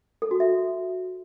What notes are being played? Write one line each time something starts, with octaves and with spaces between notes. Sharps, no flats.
A4
F#4
E5